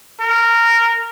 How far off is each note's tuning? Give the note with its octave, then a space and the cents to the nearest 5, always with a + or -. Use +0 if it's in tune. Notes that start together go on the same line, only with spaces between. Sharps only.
A#4 -15